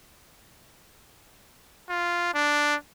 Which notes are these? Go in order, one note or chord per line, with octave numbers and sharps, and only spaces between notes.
F4
D4